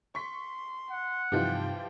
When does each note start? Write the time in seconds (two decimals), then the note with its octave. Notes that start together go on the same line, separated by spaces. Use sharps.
0.15 C6 C#6 B6
0.90 F#5
1.32 G2 C3 E3 F3 D#4 F4 G4 G5